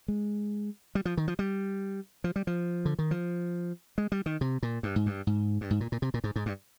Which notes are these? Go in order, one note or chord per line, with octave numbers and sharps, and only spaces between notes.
G#3
G3
F3
D#3
F3
G3
F3
G3
F3
D3
D#3
F3
G#3
G3
D#3
C3
A#2
G2
G#2
G2
G#2
G2
G#2
A#2
A#2
C3
A#2
G#2
G#2
G2